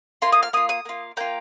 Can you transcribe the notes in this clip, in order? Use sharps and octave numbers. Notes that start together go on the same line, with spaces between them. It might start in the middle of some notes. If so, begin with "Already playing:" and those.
A#3 F4 C6
D#6
F6
A#3 F4 D#6
D#6
A#3 F4
A#3 F4 G5